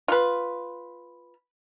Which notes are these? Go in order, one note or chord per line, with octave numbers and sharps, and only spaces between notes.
F4 B4